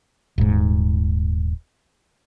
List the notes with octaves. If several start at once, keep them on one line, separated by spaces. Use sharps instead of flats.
D#1 G#2